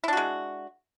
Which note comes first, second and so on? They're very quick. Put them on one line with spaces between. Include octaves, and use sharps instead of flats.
E4 D4 F#4 G#3